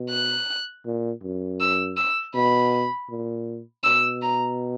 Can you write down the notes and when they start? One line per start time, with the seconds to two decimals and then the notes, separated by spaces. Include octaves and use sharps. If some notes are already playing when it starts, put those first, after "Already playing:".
Already playing: B2
0.10 F#6
0.85 A#2
1.22 F#2
1.60 E6
1.97 E6
2.34 B2 B5
3.10 A#2
3.84 B2 E6
4.22 A#5